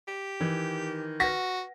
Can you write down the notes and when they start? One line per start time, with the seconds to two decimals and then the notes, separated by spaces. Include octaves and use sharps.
0.08 G4
0.41 D#3 E3
1.20 F#4 B4 F#5 A#6